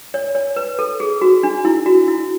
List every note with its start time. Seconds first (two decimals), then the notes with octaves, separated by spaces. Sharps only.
0.14 C#5
0.35 C#5
0.56 B4
0.79 A4
1.00 G#4
1.21 F#4
1.43 D4
1.65 E4
1.86 F#4
2.08 E4